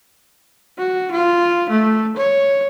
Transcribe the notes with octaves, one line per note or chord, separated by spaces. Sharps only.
F#4
F4
A3
C#5